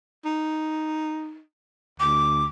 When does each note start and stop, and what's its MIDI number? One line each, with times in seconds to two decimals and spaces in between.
0.25 1.41 63
2.00 2.48 38
2.00 2.45 86